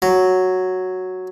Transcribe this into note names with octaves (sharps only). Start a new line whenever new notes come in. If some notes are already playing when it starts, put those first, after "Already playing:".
F#3